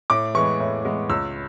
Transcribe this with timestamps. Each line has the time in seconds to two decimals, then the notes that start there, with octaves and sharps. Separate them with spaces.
0.10 A2 D6
0.35 E3 G#3 B3 C#6
0.60 A2
0.85 E3 G#3 B3
1.09 C#2 E6